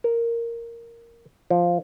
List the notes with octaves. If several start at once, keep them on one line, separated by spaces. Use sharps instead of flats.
A#4
F3